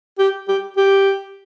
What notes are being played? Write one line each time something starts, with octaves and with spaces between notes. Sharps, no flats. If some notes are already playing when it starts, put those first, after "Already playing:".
G4
G4
G4